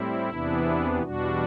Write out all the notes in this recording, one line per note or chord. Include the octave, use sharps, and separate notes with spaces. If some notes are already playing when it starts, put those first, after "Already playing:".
Already playing: A2 G3 C4 E4
E2 C3 E3 B3 D4
E2 B2 G3 D4 F#4